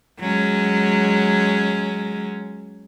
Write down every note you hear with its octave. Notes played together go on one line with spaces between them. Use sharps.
F#3 G#3 C#4